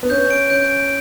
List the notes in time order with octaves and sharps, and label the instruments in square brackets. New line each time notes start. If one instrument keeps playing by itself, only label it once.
[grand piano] B3
[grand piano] C#4 [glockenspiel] G6
[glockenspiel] D7
[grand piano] C#4 [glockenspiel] G6
[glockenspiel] D7